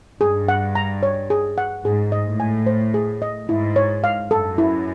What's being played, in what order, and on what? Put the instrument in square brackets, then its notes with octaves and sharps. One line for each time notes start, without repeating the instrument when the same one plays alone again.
[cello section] G2 [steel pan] G#4
[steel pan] F#5
A#5
C#5
G#4
F#5
[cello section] G#2 [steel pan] G#4
[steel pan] D#5
[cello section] A2
[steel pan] G#5
C5
G#4
D#5
[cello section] G#2 [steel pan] E4
[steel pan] C#5
F5
[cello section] F#2 [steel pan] A4
[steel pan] E4